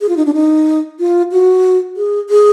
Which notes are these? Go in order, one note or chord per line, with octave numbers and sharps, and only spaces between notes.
G#4
F4
D#4
D4
D#4
F4
F#4
G#4
G#4